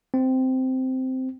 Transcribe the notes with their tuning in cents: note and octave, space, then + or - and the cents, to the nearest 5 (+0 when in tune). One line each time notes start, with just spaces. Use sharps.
C4 -10